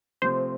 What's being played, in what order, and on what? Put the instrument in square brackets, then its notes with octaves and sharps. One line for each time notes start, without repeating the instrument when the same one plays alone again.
[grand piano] C3 F3 A3 C4 [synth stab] C5